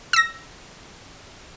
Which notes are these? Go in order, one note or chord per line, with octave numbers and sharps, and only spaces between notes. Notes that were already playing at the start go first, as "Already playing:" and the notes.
E6 A#6